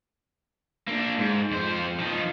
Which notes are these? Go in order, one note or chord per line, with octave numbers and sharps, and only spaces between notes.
A#3 D4
G#2
F2 C5
F3 D#4